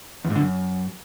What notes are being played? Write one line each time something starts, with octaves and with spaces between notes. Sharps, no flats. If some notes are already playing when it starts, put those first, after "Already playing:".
E2
G#2
D3
F#2